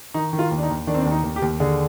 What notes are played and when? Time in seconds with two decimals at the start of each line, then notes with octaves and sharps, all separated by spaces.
0.14 D#3 D#4
0.33 D#3
0.39 F4
0.51 D#2
0.58 D4
0.63 D#4
0.69 D#2
0.87 D#3 D4
0.95 C4
1.01 D4
1.05 D#2
1.12 D#4
1.24 D#2
1.36 G4
1.42 D#2
1.60 D3 G#4